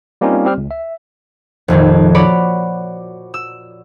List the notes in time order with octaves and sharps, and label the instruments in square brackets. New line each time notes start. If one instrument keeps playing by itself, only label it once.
[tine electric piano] G3 A#3 C4 C#4 D#4 F4
G3 C4 G4 F6
C#2
E5
[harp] F1 F2 A#2 D#3
F#4 C#5 D5 F#5 B5 D6
E6